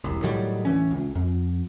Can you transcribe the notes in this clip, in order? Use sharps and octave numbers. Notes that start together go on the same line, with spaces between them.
E1 C2
A2 D#3 F#3 G3
D1 E3 C#4
C#2
F2